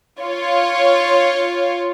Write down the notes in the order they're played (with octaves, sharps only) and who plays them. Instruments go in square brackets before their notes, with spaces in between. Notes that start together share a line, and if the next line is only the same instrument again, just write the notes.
[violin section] F4 C#5